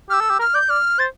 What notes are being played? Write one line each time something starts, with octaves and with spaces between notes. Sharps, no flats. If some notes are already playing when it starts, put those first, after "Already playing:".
G4 E6 F6
A4
G4
A#4 F6
D5 G6
D5 F6
C5 A6